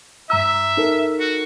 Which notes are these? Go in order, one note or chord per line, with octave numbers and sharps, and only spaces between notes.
G2 E5 A#5 E6
D#4 A4 A#4
F#4